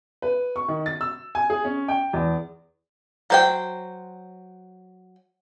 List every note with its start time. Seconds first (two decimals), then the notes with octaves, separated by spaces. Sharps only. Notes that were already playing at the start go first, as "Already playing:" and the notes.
0.22 B4
0.56 C#6
0.68 D#3
0.86 A6
1.01 E6
1.35 G#5
1.50 G#4
1.65 C#4
1.88 G5
2.13 E2
3.30 F#3 C5 G5